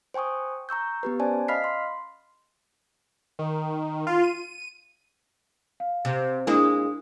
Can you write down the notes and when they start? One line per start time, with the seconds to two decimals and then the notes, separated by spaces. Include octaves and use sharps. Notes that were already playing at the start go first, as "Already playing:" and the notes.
0.14 C5 G5 G#5 C#6 D#6
0.69 A#5 C#6 E6 G6
1.03 B3 G4 B4
1.20 C#4 C5 D5 G#5 A5
1.48 D#5 F5 B5 F6 B6 C7
1.64 C6
3.39 D#3
4.07 F4
4.23 D#7
5.80 F5
6.05 C3
6.47 G#3 A#3 D4 E4 D#6